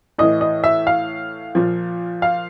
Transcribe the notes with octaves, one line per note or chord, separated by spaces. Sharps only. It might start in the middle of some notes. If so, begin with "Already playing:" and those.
A2 E3 D#5
D#5
E5
F5
A#2 F3
F5